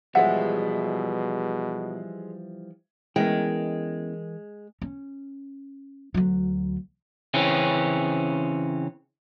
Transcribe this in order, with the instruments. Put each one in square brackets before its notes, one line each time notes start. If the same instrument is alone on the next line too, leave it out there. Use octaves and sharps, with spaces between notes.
[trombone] B2 [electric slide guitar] E3 F3 G3 [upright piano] G#3 G#4 E5 [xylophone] F#5
[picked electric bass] E3 [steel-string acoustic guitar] G#3 [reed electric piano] B3 C#4 E4 [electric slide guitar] A#4 D#5 G5
[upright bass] C#4
D2 F#3
[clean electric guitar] C#3 E3 C4 C#4